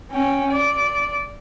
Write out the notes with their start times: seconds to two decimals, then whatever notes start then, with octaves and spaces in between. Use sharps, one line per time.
0.11 C#4 G5
0.50 D5